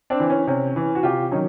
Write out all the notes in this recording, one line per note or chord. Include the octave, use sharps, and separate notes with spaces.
C4 D4
E3
C#4
C3 C#4
E3
F#4
C3 F4 G4
D#3 F#3 C#4 D#4